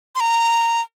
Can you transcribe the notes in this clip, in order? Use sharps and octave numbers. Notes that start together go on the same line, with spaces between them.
C6
A#5